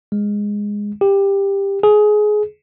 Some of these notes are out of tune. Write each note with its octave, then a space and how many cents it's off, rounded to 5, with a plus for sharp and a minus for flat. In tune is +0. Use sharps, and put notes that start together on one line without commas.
G#3 -10
G4 +15
G#4 +20